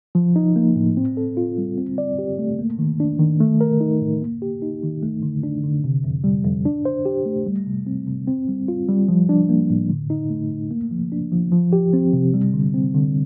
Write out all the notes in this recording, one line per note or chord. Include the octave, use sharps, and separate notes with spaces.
F3
D#4
A#3
A2
C4
A4
F4
G3
C4
D5
G4
A3
A#3
D#3
D4
D#3
A3
A#4
D#4
A2
A#3
G4
D#4
D#3
A3
D3
D4
D3
C3
F2
G3
F2
D4
C5
G4
A3
G3
C3
C4
C3
C4
G3
F4
G3
F3
D4
A#3
A2
D3
D#4
A3
F2
A#3
F3
D4
F3
F3
G4
C4
C3
G3
D3
C4
D3